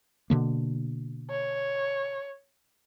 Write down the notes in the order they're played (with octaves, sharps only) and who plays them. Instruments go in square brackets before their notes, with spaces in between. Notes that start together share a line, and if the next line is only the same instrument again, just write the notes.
[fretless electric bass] B2 D3 A#3
[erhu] C#5